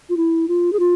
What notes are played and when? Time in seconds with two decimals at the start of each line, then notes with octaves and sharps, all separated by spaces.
0.10 F4
0.17 E4
0.48 F4
0.73 G#4
0.80 F4